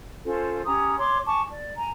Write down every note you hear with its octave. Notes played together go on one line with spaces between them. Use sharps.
C#4 F4 A4 C5
C#4 G4 A#5 D#6
C#5 C6 D6
G#5 A5 C#6 D6
D5
G#5 A#5